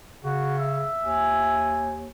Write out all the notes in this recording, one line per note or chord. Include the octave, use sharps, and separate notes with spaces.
C#3 F#4
E5
D#2 G#5